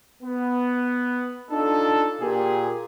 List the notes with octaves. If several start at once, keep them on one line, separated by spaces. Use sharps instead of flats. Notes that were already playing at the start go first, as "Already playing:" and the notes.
B3
D4 D#4 F4 A4
A#2 G4 G#4